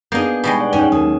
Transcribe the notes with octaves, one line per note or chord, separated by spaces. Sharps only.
A#3 B3 D4 D#4 G#4 G6 G#6
B2 G3 G#3
D5 F#5 G5
E2 A2 C#4 D#4
D#2 F#3 A#4 D#6